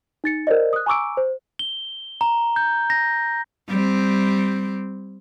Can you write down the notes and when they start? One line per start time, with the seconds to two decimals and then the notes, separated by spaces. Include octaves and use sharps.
0.24 D#4 A6 C#7
0.47 A#4 C5 D5 D#5
0.73 D#6 F#6
0.86 G#5 A#5 C#6 D6 E6 D7
1.17 C5
1.59 G7
2.21 A#5
2.56 G6
2.90 A#6
3.69 G3 C4